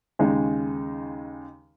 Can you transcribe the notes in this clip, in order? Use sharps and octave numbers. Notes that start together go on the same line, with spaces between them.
D#2 C#3 G#3 D#4